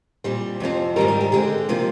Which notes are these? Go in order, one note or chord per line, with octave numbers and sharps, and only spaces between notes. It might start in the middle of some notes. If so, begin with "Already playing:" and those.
A#2 G3 C4
F2 C3 F3 C4
G#2 D#3 G3 A#4
A#4
G4
D3 G#3 C4 G4
C3 F3 A#3